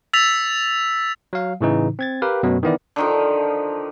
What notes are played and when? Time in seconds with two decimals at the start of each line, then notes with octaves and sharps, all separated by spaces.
0.13 E6 A6 B6 F7
1.33 F#3 F5
1.61 A2 C#3 E3 D#4
1.99 C4 G#6 A6
2.22 G4 A#4 B4 F5 G5
2.43 F#2 B2 F#3 A3 B3
2.63 D#3 E3 B3 E4 D5
2.96 D3 D#3 F3